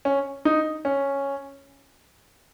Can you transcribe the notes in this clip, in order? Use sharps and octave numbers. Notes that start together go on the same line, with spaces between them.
C#4
D#4
C#4